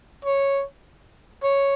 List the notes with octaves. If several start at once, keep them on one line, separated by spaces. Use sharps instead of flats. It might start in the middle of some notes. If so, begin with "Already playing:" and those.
C#5
C#5